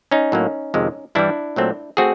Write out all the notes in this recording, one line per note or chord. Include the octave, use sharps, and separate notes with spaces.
C#4 D#4
A2 F#3 A#3
F2 C3 D#3 G#3
G2 E3 G3 D4 E4
A#2 F#3 A3 C4
A3 C4 F#4 G#4